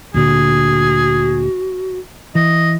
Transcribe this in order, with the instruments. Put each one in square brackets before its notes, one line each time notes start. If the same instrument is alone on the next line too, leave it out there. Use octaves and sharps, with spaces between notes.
[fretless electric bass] D2 A#2 D3 [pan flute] F#4 [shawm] G#4
[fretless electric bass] E3 [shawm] D#5